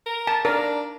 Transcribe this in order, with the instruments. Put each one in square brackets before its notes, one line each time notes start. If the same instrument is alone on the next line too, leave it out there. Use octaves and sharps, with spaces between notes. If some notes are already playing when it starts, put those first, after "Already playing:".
[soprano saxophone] A#4
[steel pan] A5
[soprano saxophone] D4 [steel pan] A#4